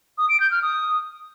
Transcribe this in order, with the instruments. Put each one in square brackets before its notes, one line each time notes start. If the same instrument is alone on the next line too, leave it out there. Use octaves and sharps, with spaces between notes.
[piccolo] D#6
D7
G6
F6
D#6